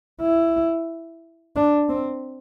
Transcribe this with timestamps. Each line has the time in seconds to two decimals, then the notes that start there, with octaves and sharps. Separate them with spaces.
0.21 E4
1.56 D4
1.89 C4